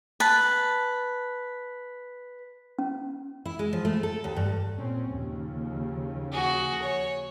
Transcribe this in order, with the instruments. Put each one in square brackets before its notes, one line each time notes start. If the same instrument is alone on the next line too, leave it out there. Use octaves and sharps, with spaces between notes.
[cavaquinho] B4 A5
[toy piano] C#4
[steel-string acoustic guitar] E4
G#3
F3
A3
A4
D#2
G2
[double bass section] A#2 C4 C#4
D#2 C#3 F3
[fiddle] F#4 G#4
C#5